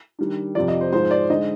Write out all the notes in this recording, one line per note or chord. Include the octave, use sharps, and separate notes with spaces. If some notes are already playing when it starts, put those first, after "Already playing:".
D#3 G3 D4
F2 C3 F3 D5
D#5
C5
G#2 F3 G#3 C5
D5
D3 G#3 D#4 D#5